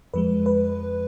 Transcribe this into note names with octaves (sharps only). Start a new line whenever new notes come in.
F2 F3 G#3 B4
B4